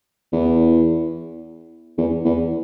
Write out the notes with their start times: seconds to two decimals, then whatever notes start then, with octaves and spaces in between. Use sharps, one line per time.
0.32 E2
1.98 E2
2.25 E2